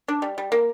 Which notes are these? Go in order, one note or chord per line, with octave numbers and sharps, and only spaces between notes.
D4
G3
G3
A#3